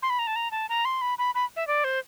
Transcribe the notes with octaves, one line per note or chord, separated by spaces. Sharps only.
C6
B5
A#5
A5
A#5
A5
A#5
C6
B5
B5
B5
E5
D5
C5